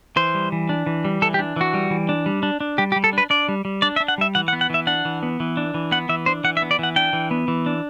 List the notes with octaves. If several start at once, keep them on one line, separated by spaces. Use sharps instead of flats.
E3 C5
G3
E3
D4
E3
G3
E3 A4
G4
D4
E3 F#4
G3
E3
D4
G3
D4
D4
G3 G4
G4
G3
A4
D4 B4
D4 D5
G3
G3
D4 D5
E5
D4
F#5
G3 E5
E3 F#5
F#5
B3
F#5
E3 E5
D4 F#5
E3
B3
E3
D4
E3
B3 F#5
E3 E5
D4 C5
E3 F#5
E5
B3
D5
E3 F#5
D4 G5
E3
B3
E3
D4